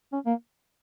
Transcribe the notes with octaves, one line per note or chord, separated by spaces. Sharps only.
C#4
A#3